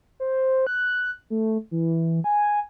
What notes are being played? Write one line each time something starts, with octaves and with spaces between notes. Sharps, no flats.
C5
F#6
A3
E3
G#5